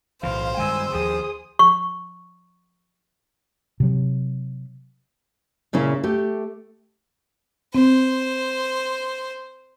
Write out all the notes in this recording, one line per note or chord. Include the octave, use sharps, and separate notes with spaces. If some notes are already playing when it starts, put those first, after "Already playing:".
B1 A2 E3 C5 F5
G2 D#3 G#3 G#5 E6
D#2 D#3 F3 G#4 D#6
C#6
C3 F#3
A#2 C#3 C#4 E4
A3 G4
C4 C5